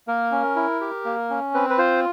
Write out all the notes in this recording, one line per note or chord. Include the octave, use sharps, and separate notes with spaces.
A#3 A#4
C#4
E4
G4
A#3
C#4
C4 B4
B4
F4 C5